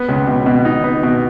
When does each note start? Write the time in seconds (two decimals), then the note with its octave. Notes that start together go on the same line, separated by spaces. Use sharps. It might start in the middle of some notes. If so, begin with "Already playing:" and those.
Already playing: B3
0.09 C#2
0.27 B2
0.46 B2
0.65 D#4
0.84 B3
1.03 B2